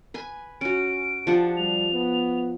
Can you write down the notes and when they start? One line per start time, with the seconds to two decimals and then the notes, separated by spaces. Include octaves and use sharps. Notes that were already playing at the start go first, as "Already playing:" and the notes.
0.14 B4 G#5
0.61 C#4 F#4 D7
1.27 F3 D4 G4 F#5
1.57 G3 F7
1.94 B3